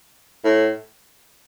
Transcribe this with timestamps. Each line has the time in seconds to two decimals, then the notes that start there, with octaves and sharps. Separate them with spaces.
0.44 A2